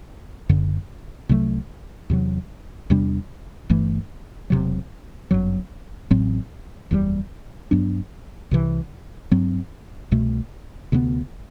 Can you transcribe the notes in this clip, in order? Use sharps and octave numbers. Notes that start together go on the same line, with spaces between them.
F#1 F#2 D3
C2 C3 F#3 A3
E2 C3 F#3
E2 C3 G3 D4
G1 G2 E3 A3
E1 D2 C3 F#3
G1 F#2 F#3
A1 A2 F#3 C4
F#1 E2 B2 G3
G2 F#3 B3 D4
C2 C3 E3
G2 F#3 C4
C2 B2 A3
D2 C3 F#3 B3